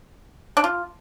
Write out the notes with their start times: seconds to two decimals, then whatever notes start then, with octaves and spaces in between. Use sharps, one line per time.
0.57 D4
0.64 F4